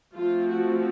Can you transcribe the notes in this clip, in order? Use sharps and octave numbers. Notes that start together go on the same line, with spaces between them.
F3 A3 C4 F4
F#4